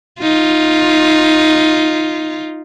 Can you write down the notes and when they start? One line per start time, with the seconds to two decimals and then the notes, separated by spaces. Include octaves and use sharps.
0.20 D#4 F4